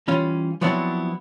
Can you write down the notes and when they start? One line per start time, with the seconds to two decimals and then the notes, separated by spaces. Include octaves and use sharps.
0.08 E3 G3 C#4 F4
0.61 F3 F#3 B3 C4 D4 E4